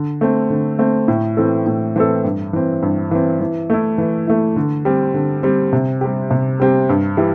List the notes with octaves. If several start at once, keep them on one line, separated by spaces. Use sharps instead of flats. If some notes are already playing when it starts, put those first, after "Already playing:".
Already playing: D3
A3 C4
D3
A3 C4
A2
E3 C4 A4
A2
E3 C4 A4
G2
E3 C4
G2
E3 C4
E3
A3 E4
E3
A3 E4
D3
G3 C4
D3
G3 C4
C3
G3 C4 G4
C3
G3 C4 G4
G2
E3 G3 E4